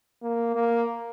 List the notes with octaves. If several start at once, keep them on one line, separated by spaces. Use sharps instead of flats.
A#3
A#3